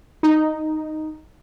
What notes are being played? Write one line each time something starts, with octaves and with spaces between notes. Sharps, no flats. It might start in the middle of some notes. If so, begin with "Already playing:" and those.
D#4